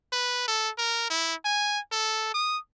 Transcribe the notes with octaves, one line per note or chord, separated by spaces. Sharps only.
B4
A4
A#4
E4
G#5
A4
D#6